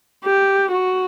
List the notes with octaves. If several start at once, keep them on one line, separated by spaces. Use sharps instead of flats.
G4
F#4